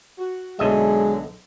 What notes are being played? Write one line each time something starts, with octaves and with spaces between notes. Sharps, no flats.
F#4
B1 D3 F#3 G#3 D#5 E5